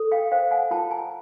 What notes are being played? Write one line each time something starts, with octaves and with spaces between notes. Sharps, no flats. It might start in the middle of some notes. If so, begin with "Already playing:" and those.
Already playing: A4
F5 G5
C5 F5 G5
F#5 G#5
F4 G5 A5
G#5 A#5